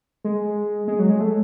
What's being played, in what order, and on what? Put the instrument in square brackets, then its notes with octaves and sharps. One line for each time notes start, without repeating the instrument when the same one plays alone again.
[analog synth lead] G#3
G#3
F#3
G#3
A3